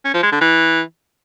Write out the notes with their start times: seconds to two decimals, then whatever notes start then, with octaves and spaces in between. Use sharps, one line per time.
0.05 C#4
0.14 F3
0.23 G#3
0.32 D3
0.41 E3